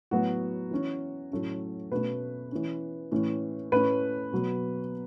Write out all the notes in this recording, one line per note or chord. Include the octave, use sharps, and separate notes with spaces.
A2 F#3 B3 F#4
E3 C#4
A2 F#3 A3 C#4
B2 A3 C#4 B4
E3 C#4
A2 E3 C#4
A2 A3 C#4 B4
B2 F#3 B3